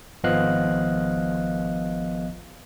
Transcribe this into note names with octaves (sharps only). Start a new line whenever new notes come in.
G#1 F3 B3 D#5 F5 F#6